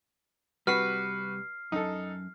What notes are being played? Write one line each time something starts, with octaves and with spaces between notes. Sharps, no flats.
C3 G3 F#4 B4 F6 C7
F#2 D#4 A4